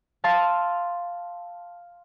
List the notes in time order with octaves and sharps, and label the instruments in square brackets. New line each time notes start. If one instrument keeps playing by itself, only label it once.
[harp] F5 A5 C6 E6 A6